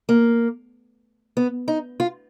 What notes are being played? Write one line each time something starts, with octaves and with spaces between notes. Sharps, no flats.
A#3
B3
D#4
F4